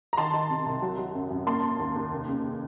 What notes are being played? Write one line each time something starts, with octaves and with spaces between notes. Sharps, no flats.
A#5
D#3 A5 C6
D#3
C3
C2
F#3
F#3
F#2
F#2
A#3 A5 C6
A#3
D#2
D#2
F1
C#3